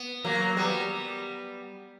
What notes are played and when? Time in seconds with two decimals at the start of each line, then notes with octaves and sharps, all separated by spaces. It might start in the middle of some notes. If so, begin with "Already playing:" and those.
Already playing: B3
0.25 F#3 A#3
0.57 G3 B3